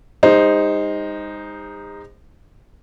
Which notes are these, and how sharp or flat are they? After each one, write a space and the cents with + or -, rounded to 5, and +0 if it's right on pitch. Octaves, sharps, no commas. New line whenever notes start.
G#3 -45 D#4 +0 C5 +0